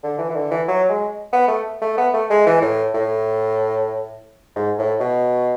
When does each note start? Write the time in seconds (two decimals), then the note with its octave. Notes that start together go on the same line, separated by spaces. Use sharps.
0.04 D3
0.19 E3
0.30 E3
0.36 D3
0.51 E3
0.68 F#3
0.89 G#3
1.33 B3
1.48 A3
1.81 A3
1.97 B3
2.14 A3
2.30 G#3
2.47 E3
2.62 A2
2.94 A2
4.56 G#2
4.78 A2
5.00 B2